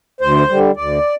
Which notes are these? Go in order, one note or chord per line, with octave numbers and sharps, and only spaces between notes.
D2 C5
D3 G3
D2 D5